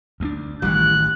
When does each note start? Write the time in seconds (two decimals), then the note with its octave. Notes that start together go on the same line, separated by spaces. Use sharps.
0.20 D2 G3 D4
0.62 A1 D#3 E3 G3 F#6